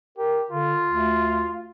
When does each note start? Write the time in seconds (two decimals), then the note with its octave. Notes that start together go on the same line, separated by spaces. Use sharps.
0.18 G4 A#4
0.50 D3 F4
0.88 D2